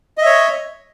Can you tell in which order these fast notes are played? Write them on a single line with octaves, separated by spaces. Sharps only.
D#5 E5 C#5